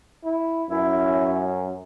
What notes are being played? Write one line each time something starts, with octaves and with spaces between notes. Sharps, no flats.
E4
F#2 C#4 E4